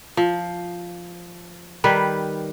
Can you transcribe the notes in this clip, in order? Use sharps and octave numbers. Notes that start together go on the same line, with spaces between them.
F3
D#3 G3 B4